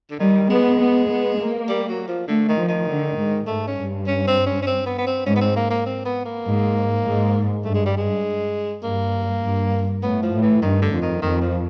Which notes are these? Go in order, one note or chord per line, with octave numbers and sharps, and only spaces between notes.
D3
D#3 G3
G#3 B3
B3
B3
A#3
G3
F#3
F3
D3 A3
D#3
F3
D#3
D3
G#2
G#2 A3
C#4
G2
C#4
C4
C#4
C#4
C4
B3
B3
C4
G#2 C#4
B3
C4
A#3
A#3
C4
B3
A#3
G#2
G#2
G2 A3
G#3
G3
G#3
G2 A#3
G2
A2 B3
F3
A2
E3
G2 D#3
D3
F2
D#3
F2 D#3
F3